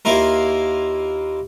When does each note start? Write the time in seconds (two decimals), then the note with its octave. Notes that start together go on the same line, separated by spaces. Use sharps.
0.05 D#2 A#3 E4 F4 A#4